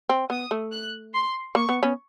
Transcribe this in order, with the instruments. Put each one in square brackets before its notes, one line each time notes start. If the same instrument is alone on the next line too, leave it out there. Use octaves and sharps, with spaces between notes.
[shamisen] C4
[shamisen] B3 [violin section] D#6
[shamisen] A3
[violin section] F#6
C6
[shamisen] A#3 [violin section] C#6
[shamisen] B3
B3 C#4